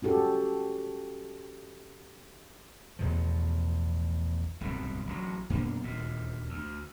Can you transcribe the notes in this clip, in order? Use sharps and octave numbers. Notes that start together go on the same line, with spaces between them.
C#4 F#4 G4 A4
A1 E2 B2 F3
D1 C2 G2 B2
A1 A2 F#3
F#2 B2 A#3 D4
D#1 D2 A#2
D2